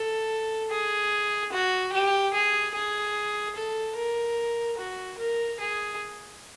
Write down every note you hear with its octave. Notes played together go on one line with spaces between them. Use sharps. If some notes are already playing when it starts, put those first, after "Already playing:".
Already playing: A4
G#4
F#4
G4
G#4
G#4
A4
A#4
F#4
A#4
G#4